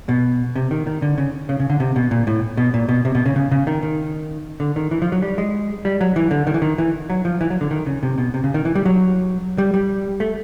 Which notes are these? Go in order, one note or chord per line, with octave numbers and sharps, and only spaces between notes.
B2
C3
D#3
D#3
D3
C#3
C#3
C#3
D3
C3
B2
A#2
A2
B2
A#2
B2
C3
B2
C#3
C#3
C#3
D#3
D#3
D3
D#3
E3
F3
F#3
G3
G#3
G3
F#3
E3
D3
D#3
E3
D#3
E3
F#3
F3
E3
F#3
D3
D#3
C#3
C3
B2
C3
C#3
D#3
E3
G3
F#3
G3
G3
A3